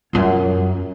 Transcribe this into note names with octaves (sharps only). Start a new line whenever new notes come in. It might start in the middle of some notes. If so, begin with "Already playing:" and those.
F#2 F4